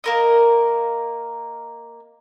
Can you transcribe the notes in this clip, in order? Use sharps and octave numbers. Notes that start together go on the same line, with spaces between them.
A#3 A#4 D#5